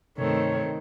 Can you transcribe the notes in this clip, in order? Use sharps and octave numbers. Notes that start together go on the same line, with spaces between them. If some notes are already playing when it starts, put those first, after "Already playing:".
G2 C3 D#3 A3 C4 C#5